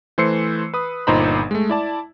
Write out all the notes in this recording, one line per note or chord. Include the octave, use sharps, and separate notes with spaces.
E3 A3 C5 E6 C7 C#7
B4 D#6
G1 A#2 D#4 C5 A#5 B5
G#3 A3
E4 D5 A5